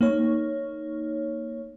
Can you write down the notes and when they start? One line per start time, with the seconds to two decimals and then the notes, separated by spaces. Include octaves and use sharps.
0.01 A#3 D#4 C#5